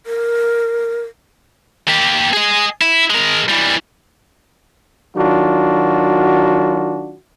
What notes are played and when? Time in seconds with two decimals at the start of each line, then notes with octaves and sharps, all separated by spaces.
0.06 A#4
1.89 A#3 G4
2.33 G#4 D#5
2.81 E4
3.10 G#3 A#4
3.48 E3 G3
5.16 D#3 F#3 D4 F4 F#4